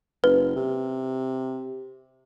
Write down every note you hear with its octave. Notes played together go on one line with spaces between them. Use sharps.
F#1 B4
C3